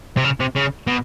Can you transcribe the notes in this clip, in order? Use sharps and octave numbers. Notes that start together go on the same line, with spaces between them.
C3
C#3
C3
C#3
B2